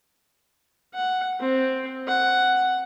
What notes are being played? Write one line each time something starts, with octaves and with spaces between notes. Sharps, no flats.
F#5
C4
F#5